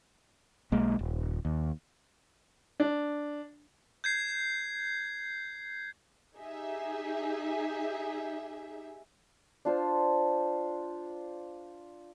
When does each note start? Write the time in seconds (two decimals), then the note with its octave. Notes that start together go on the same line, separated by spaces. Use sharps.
0.72 B1 G#3 A#3
0.99 D#1
1.45 D#2
2.80 D4
4.04 G6 G#6 C7
6.36 D#4 G4 G#4 E5
9.65 D4 F4 C5